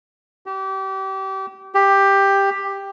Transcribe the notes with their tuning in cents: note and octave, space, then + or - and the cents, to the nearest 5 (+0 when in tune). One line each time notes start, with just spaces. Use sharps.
G4 -30
G4 +10